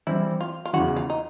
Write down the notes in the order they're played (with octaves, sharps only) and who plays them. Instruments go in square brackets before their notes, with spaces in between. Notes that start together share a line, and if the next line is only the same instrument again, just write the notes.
[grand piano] E3 G3 C4 [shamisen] E4
[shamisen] F4
F4
[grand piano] E2 C#3 E3 [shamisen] F#4
[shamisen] F4
D#4